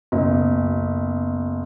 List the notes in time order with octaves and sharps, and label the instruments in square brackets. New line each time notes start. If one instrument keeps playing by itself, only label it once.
[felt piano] F#1 B1